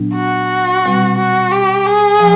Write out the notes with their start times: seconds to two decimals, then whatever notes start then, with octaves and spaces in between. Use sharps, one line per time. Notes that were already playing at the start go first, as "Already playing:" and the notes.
Already playing: A#2 F#3 B3 D4
0.15 F#4
0.84 B2 G3 C4
1.18 F#4
1.52 G4
1.87 G#4
2.20 F3